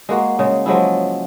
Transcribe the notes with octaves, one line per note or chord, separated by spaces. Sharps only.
G#3 A#3 F#4
C#3 G#3
F3 F#3 G#3 E4